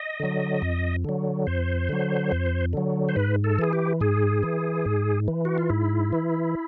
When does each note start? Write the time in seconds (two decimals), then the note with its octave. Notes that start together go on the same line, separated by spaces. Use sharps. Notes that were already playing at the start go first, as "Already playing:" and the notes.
Already playing: D#5
0.20 D3 F#3
0.62 F2
1.05 D3 F#3
1.47 F2 C5
1.89 D3 F#3
2.32 F2
2.73 D3 F#3
3.09 C5
3.16 G#2 B4
3.44 A4
3.59 E3 G#4
3.73 G4
4.01 G#2 G#4
4.43 E3
4.86 G#2
5.28 E3
5.45 F#4
5.58 F4
5.70 G#2 E4
6.13 E3